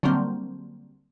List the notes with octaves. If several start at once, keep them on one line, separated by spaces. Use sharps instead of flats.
D3 F#3 G3 A#3 C4